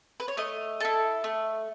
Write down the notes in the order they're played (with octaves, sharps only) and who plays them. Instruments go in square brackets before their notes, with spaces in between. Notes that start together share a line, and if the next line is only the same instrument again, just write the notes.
[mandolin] B4
C#5
A3 D#5
E4 A4
A3